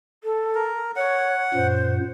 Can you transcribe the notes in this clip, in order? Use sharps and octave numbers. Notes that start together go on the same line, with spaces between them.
A4
A#4
C#5 F#5
F#2 A#2 C5